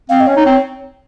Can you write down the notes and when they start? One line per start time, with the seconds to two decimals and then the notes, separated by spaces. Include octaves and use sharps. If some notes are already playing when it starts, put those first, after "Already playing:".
0.09 C4 F5
0.20 D#5
0.27 C#4 C#5
0.37 D#4
0.46 C4